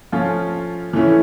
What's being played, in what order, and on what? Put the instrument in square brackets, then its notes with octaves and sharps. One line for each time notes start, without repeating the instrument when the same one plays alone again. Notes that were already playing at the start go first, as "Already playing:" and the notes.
[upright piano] F3 A3 C#4 F4
E3 A3 C#4 E4